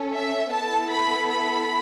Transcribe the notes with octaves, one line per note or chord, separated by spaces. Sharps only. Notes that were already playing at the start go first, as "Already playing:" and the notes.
Already playing: C#4 A4
E5
B3 E4 A4 A5
B5
B5